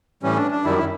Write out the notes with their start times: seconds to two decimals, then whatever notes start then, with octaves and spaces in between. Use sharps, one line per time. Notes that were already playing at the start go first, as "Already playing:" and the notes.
0.23 A2 E3 G3 C#4
0.36 D4
0.51 D4
0.65 F#2 D#3 G3 E4
0.78 E4